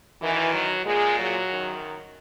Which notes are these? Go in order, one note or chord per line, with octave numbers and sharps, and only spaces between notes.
F#2 D#3 E3
F#3
A#2 G#3
F#3
F#2 D#3